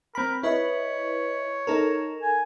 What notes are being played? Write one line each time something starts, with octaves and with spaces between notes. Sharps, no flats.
C4 A#4 B5
E4 B4 C#5 D#5
D#4 A4 A#4
G#5